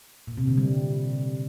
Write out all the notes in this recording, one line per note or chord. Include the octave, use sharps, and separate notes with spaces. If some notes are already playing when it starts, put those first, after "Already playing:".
A#2
C3
D3
G3